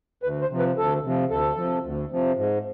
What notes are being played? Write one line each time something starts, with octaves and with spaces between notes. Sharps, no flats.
D2 B4
C5
C3 F3
B4
D2 A4
C3 F3
D2 A4
C3 F3
D2
C3 F3
G#2